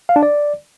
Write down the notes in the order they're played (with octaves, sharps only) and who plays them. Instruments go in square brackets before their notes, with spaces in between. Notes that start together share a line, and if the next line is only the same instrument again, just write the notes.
[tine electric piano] F5
D4
D5